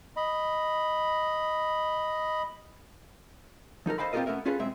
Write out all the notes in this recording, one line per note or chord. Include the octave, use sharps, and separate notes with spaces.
D#5 B5
F3 D#4 A4 A#4
A4 C5 D#5 F5 G5 B5
C4 F4 G4 A4 A#4 D#5
A3 B3 C#4 A#4 E5
C#4 F4 G#4 A4 B4 C#5
B1 G#3 C4 E5